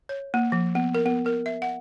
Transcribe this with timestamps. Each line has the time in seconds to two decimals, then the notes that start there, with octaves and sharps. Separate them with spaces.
0.09 C#5
0.34 A#3
0.52 F3
0.75 B3
0.95 A#4
1.06 B3
1.26 A#4
1.46 E5
1.62 F#5